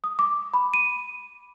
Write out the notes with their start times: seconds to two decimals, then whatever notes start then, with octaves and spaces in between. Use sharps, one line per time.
0.04 D#6
0.19 D6
0.54 B5
0.74 D#7